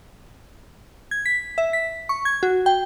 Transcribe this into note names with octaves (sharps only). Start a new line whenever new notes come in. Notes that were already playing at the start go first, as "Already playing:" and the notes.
G#6
B6
E5
B6
C#6
G#6
F#4
G5